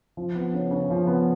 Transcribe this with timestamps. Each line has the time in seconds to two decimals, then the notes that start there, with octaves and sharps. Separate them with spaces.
0.17 F3
0.35 B3
0.53 C#3
0.71 C#3
0.90 F3
1.07 B3